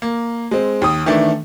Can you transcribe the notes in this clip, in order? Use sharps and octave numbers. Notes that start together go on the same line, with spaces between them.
A#3
G#3 C4
D#2 D#6
D#3 E3 A3 D4